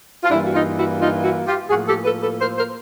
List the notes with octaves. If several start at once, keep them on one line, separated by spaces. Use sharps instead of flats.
F4
G2 E3 G3 A#3 D4 E4
F#4
D#4 F4
E4 F#4
D#4 F4
E4 F#4
F4 G4
A2 F3 A#3 F#4 G#4
G4 A4
A4 B4
A4 B4
A#4 C5
A#4 C5